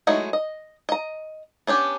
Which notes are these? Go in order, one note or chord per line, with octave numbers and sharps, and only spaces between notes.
F#3 G#3 A3 D#4 E4
D#5
D#5 A#5
B3 C#4 D4 G4